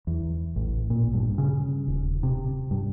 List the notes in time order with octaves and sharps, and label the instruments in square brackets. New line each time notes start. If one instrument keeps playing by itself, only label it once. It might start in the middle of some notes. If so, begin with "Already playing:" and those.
[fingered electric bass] E2
A1
A#2
G2
C#3
D#1
C3
G2